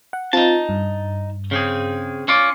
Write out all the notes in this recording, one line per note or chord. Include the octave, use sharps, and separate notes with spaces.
F#5
C4 D#4 F4 A5
G2
C#3 C4 G#4
C#4 F4 D5 C#7